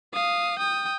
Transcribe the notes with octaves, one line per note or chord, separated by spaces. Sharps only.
F5 D#6
G5 D#6